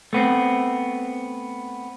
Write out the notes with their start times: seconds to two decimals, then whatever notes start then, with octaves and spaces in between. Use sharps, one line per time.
0.13 A3 B3 C4